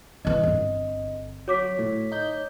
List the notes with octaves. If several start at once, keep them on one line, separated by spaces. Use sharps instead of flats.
G#2 E3 D#5
G1 D3 C4
F#3 C#5 D6 B6
A2
D#4 G6